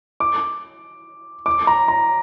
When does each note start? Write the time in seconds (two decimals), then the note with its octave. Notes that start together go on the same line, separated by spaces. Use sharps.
0.20 D6
1.46 D6
1.67 A#5
1.88 A#5